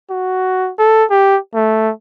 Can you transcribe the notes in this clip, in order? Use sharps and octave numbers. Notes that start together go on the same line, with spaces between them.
F#4
A4
G4
A3